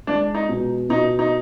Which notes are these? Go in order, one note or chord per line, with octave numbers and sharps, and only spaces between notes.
G#3 D4
D#4
B2
B2 D#4
D#4